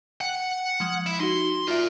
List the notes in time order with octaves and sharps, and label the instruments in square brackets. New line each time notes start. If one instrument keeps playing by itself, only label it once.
[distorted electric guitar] F#5 [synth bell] G5
[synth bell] F3 G#3 F#7
[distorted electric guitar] E4
[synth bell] D#4 F#4 [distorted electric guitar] C6
[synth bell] F4 E5 [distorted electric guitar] A#4 D5